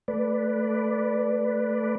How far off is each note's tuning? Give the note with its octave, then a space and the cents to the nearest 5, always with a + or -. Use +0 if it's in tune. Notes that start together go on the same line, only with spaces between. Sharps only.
A3 +0 B4 +0 D5 +0